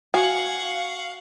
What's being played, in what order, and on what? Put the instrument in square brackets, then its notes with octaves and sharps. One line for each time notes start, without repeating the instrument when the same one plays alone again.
[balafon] F#4 [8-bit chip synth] F5 [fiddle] F#5 C#6 [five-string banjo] G#5